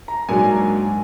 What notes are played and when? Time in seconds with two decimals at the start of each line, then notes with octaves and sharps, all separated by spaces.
0.08 A#5
0.29 G#2 F#3 A#3 D4 G#5